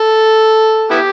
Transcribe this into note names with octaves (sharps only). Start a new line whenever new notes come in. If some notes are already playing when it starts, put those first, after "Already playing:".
Already playing: A4
B3 E4 G4